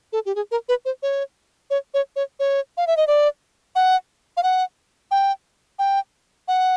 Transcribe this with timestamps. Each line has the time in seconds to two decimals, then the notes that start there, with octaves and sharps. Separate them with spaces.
0.13 A4
0.26 G4
0.35 G#4
0.51 A#4
0.69 B4
0.85 C5
1.03 C#5
1.70 C#5
1.94 C#5
2.16 C#5
2.40 C#5
2.77 F5
2.87 E5
2.97 D#5
3.07 D5
3.76 F#5
4.37 F5
4.43 F#5
5.11 G5
5.79 G5
6.48 F#5